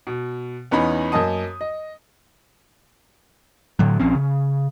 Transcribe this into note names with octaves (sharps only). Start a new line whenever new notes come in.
B2
E2 B3 C#4 D#4 B5
F#2 A#3 D#5 A5 D#6
D#5
A2 D3 F#3
A#1 F3 C4 C#4
C#3